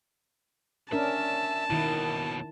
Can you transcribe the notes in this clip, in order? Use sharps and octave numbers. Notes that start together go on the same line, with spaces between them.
C#4 D4 A#4 E5 A5
D#2 B2 D#3 E4